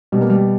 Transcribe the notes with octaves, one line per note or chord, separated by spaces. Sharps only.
B2 G3
A#3
G3